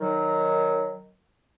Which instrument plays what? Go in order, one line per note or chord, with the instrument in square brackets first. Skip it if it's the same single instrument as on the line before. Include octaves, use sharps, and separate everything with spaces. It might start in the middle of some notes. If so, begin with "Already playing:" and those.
[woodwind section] D#3 F#3